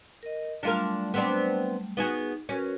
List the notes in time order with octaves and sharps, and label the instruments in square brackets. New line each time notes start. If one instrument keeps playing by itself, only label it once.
[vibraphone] A#4 D#5
[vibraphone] F#3 G3 A3 [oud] D4 F4 A#4
[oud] B3 C4 D4
[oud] B3 F#4 G#4 [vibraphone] D#4
[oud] C#4 [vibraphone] F#4 A#4 B4